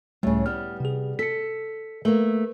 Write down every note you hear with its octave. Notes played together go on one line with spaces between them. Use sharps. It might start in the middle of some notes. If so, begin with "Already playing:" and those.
C#2 A2 C#3 G3
G3 B3 F6
C3 G#4
A4 B6 C#7
A3 A#3 A#4 B4